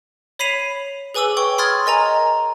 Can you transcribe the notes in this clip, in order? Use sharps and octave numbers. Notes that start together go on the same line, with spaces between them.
C#5 B5 B6 C7 D#7 F7
G#4 B4 G#5 D6 E6 F#7
C#5 G5 C#6 G7
B5 C6 D#6 F6 G#6 A6
A#4 D#5 G#5 A#5